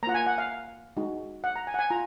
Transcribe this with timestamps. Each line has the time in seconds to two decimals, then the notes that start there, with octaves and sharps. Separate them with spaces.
0.03 A#3 A#5
0.07 F4 F#5
0.14 G#5
0.27 F#5
0.38 F5
0.97 G#3 D#4 F#4
1.44 F#5
1.56 A#5
1.67 G#5
1.74 F#5
1.79 G#5
1.90 F4 A#5